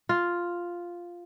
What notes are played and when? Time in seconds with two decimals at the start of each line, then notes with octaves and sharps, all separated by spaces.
0.09 F4